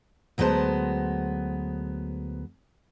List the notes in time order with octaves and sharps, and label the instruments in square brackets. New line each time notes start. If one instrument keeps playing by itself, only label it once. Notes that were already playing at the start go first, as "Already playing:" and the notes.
[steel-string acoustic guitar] D2 F#3 G#3 B3 C5 A5